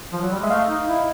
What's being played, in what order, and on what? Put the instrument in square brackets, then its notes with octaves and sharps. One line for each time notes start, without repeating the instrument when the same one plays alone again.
[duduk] F3
F#3
G3
[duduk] G#3 [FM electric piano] E5
[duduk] A3 [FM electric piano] D#5 F5
[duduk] D#4
E4